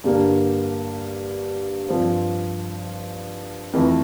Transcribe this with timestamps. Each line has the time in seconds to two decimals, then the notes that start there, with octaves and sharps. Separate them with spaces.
0.04 G2 D3 G3 A#3 D4
1.89 G2 F3 C4
3.73 F2 E3 A3